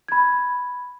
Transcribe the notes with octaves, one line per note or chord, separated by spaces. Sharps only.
B5 G#6